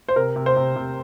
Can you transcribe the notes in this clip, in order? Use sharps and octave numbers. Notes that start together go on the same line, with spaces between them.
C5
C3 A#4
C3
C5
C3
C3